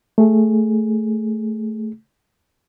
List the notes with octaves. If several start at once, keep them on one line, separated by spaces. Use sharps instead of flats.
A3 G#4